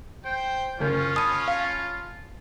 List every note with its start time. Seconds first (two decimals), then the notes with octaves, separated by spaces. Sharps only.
0.25 C5 G5
0.80 F#1 C#4 F4 A#4 G6
1.16 A5 B5 D#6 D#7
1.48 F5